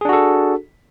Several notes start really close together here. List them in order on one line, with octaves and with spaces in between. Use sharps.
G#4 D4 F#4 A4